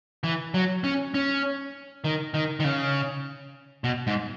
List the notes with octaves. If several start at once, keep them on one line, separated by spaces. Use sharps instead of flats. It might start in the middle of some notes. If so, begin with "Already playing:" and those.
E3
F#3
C#4
C#4
D#3
D#3
D#3
C#3
B2
G#2